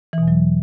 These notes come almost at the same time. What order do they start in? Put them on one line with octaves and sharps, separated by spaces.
E3 B2 E2 F#3